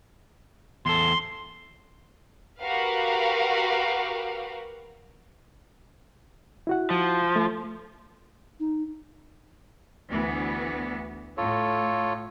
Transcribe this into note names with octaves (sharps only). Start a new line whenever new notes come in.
E2 A4 C6
F#4 G4 A#4 B4 F5
E4 F#4 F#5
F3
A3
D#4
D2 E3 B3
A2 F4 A4 C#5